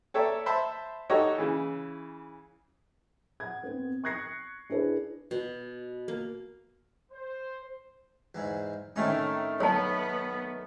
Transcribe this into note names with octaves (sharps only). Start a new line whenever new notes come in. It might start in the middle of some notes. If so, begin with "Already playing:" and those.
A4 C#5 D5 E5 G5 A#5
C5 E5 A5 B5 C6
D#4 F#4 G4 A4 C#5 D#5
C#3 E3
F#5 G#6
B3 C4
C#6 F#6 G#6 A#6 C7 C#7
D4 E4 G#4 B4
B2
A#3
C5
E2 G#2
A2 D#3 A3 C4 C#4 D#4
B1 B3 C#5 A5